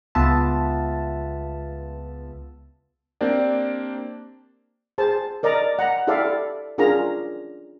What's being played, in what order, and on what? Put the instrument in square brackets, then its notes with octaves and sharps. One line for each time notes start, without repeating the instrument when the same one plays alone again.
[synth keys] C#2 B3 F4 E5 A5
[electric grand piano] A#3 C4 D4 G4 D5
[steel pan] G#4 C5 A5
A#4 D5 D#5 A#5
F#5 A#5
E4 G4 A4 D5 E5 F5
C#4 D4 F4 G#4 A#4 A#5